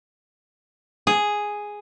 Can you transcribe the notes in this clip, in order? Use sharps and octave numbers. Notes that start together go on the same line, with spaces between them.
G#4